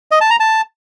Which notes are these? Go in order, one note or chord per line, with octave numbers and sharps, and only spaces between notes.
D#5
A5
A#5
A5